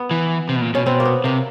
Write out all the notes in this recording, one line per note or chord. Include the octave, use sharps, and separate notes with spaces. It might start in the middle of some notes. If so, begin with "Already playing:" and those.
Already playing: B3
E3
C3
B2
A#2
B2 C#4
B2 C4
A#3
B3
C3 A#3